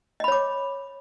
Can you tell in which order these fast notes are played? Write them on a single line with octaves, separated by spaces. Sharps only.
D#5 B5 C#5 D6